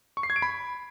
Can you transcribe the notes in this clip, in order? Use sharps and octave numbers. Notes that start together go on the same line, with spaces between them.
C#6
C7
G#6
D7
B5